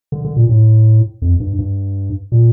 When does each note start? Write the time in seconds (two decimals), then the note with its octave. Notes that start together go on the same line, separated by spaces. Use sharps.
0.12 D3
0.25 D3
0.37 A#2
0.49 A2
1.22 F2
1.40 G2
1.59 G2
2.32 A#2